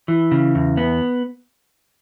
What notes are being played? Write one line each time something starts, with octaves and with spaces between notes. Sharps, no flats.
E3
C#3
E2
B3